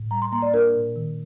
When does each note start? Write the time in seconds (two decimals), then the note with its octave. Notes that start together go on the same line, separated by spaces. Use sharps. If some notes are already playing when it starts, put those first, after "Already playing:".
Already playing: A2
0.11 G3 A#5
0.22 C6
0.32 A#3 A#5
0.42 D5
0.53 D4 A#4
0.75 A#2
0.96 D#3